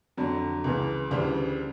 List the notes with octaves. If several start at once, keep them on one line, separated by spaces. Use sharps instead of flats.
F2 D3 F#3
C#2 C#3 E3
D2 C#3 E3 G3